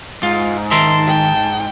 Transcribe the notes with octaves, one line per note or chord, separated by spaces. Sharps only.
G#2 F4 F5
D#3 A#4 E5 A5 C6
G5